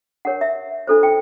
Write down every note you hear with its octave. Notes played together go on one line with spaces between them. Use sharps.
D4 G4 A#4 C#5 F#5
E5
D4 F4 A4 C5
G5